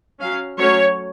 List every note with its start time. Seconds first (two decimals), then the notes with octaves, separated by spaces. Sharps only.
0.20 F#3 C#4 F5
0.58 F#3 A3 C#4 C#5